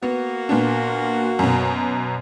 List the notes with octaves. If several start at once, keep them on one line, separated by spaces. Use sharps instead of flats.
A#3 B3 F#4
A#2 B3 D4
F#2 B2